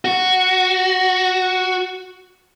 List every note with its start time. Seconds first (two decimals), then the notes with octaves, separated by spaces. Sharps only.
0.05 F#4